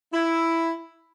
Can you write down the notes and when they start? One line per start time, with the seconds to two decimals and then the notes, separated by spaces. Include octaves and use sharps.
0.13 E4